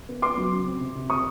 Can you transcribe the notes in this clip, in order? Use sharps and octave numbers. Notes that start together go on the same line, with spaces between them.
B3
B3 C6 D6
F#3
C#3
C4
C3
C3
C3 C#6 D#6